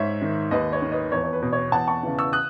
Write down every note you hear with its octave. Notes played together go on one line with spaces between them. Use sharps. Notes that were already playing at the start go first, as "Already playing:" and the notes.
Already playing: G#2 C#5 E5
D#3
D#2 B4 D#5
C#5
D#3
B4 D#5
E2 C#5
C#5
B4
B2
C#5
E2 F#5 A5
A5 C#6
C#3 E3
C#6 E6
D#6 F#6